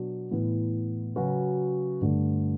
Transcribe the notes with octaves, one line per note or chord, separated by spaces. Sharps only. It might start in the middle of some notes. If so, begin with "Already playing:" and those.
Already playing: B2 F#3 B3 D4
A2 E3 B3
C#3 F#3 C#4 F#4 B4
G2 D3 A3